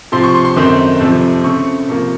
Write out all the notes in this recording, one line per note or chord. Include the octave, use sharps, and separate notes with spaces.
C3 F3 C4 C6
C#6
C6
C6
F#2 D#3 A3 C4
F2 C3 F3 A3
C#3 A3 C4 C#6
C3 F3 A#3